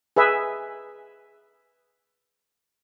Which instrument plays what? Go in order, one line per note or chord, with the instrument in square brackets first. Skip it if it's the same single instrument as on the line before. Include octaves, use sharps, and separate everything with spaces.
[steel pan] G#4 B4 E5